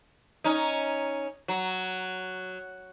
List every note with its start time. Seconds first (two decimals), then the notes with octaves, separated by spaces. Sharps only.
0.44 C#4 D#4
1.48 F#3